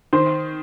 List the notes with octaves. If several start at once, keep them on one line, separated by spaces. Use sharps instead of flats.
D#3 C5